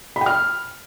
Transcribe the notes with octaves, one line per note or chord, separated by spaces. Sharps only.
B5
G5
F6